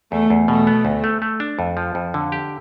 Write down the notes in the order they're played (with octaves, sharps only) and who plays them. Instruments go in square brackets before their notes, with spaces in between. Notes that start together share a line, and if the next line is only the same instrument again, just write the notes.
[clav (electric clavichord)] E2 [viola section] A3
[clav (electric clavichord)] E2
[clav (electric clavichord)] B2 [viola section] A3
[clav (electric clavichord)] B3
D2
A3
A3
D4
F2
F3
F2
D3
G4